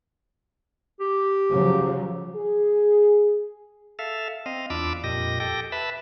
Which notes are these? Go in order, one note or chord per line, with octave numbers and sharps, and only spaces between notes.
G4
C#3 F3 F#3
G#4
A4 E5 F5
C4 D#5 F5
E2 D4 F4 B5 D6 E6
F2 A#2 G4 D#5 A#6
G4 A4 G5 A#6
B4 E5 A5 B5